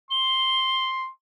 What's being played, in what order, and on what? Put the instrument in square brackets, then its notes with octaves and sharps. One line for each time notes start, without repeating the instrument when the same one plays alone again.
[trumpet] C6 [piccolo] G7